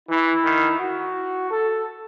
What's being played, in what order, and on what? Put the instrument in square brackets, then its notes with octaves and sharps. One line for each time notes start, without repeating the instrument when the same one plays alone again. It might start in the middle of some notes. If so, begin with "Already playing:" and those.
[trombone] E3 [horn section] E4
[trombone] D#3
[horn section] F#4
A4